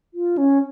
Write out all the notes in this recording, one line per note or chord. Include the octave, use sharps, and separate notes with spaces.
F4
C#4